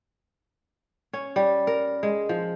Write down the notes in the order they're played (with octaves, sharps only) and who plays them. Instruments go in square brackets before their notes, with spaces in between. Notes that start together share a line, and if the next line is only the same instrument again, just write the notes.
[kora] C#4
G3
A#4
G#3
F3